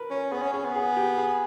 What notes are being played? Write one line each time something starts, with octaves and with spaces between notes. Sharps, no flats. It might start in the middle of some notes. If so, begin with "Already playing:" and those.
Already playing: A#4 B4
C#4 A#4
B3 G#4
C#4
C#4 G#4
B3
G#4
G4
G#4